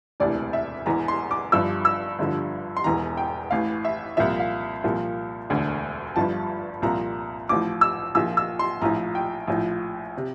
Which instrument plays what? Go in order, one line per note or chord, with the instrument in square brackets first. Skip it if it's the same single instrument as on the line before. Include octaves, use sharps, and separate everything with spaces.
[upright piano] E1 D2 C3 E3 D5
E5
E1 E2 E3 A#5
C6
D6
G1 G2 F3 E6
E6
G1 G2 D3 F3
C6
E1 E2 E3 A#5
G5
A1 A2 E3 F5
E5
C2 A#2 F3 E5
F5
C2 A#2 F3
E1 D2 D3
G1 G2 F3 A5
C2 A#2 F3 A#5
A1 A2 F3 D6
E6
A#1 A#2 F3 E6
E6
C6
A#1 A2 F3 A#5
G5
A#1 A2 F3
C3